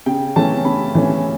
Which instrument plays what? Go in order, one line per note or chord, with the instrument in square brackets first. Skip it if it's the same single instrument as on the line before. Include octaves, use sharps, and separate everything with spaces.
[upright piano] C#3 G5
E3 A3 C#4 A5
C#3 B5
E3 A3 C#4